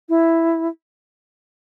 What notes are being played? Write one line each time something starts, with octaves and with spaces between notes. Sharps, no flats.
E4